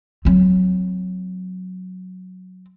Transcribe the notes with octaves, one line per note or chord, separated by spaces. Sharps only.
F#3 C4